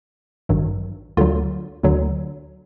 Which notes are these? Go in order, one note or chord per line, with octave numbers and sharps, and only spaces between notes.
A1 G2 D#3 F#3
D2 D3 F#3 F4
D2 D3 F#3